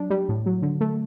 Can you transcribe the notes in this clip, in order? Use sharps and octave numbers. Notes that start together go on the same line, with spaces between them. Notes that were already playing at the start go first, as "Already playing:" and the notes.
Already playing: F#3 D4
G3
A2
F#3
D3
A3